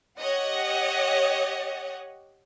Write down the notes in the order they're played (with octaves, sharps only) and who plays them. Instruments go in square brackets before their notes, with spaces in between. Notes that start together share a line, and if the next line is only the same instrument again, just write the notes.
[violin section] G4 C#5 D#5 F#5